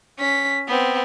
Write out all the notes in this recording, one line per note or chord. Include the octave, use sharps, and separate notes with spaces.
C#4 B6
B3 C4